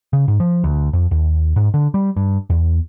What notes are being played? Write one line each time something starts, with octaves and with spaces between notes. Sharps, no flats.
C#3
G#2
F3
D2
F2
D#2
G#2
D3
G3
G2
E2